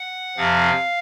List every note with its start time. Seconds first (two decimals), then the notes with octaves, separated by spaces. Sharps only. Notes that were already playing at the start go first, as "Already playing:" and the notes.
Already playing: F#5
0.37 F2 C3 F3 C4 F5